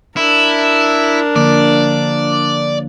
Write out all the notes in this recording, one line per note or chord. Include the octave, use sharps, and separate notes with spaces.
D4 E4 A#4
D3 F3 A#3 D5